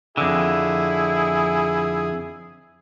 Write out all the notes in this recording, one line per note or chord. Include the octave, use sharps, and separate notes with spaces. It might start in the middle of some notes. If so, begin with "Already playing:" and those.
F2 D3 E4 G#4